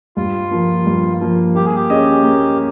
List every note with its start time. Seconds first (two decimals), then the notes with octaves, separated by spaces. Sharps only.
0.17 G2 F4
0.51 F3 A#3
0.86 G2
1.21 F3 A#3
1.55 A#3 G4
1.65 G#4
1.76 G4
1.90 C#4 G#4 D#5
2.23 A#3